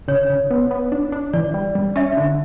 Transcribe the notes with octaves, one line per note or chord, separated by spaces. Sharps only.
C#3 C#5
C#3
B3
B3
D4
D4
E3 D5
G3
G3
C#4 E5
D3